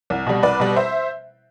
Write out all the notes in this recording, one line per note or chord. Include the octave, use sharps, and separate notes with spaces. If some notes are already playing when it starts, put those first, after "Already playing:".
C2
B2 G3
C2 B4 D5
B2 G3
C5 E5